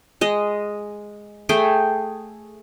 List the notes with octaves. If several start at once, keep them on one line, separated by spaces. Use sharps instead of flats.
G#3 D#5
A3 G#4 G5